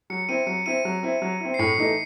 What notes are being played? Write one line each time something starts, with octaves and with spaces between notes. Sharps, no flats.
F#3 C#7
C4 E4 D#7
F#3 C#7
C4 E4 D#7
F#3
C4 E4
F#3
C4 E4
C7
A2 C#7
E3 A3 D#4